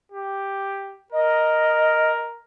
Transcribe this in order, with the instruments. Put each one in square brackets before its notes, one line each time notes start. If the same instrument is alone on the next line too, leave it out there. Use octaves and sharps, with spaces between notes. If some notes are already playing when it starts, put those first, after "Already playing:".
[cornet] G4
[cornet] A#4 [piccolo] D#5